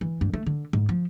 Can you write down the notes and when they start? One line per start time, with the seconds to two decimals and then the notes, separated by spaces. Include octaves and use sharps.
0.01 E3
0.21 G2
0.34 A3
0.46 D3
0.73 G#2
0.89 F3